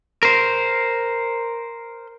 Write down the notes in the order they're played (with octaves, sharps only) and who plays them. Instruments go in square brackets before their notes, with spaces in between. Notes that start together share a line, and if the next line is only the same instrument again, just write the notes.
[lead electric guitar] A#4 C5